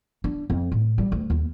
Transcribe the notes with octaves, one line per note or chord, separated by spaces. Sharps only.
D4
F2
A2
G3
D2
D#2